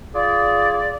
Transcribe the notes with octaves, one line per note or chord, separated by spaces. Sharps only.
F4 G#4 D5